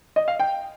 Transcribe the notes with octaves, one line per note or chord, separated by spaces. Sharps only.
D#5
F5
G5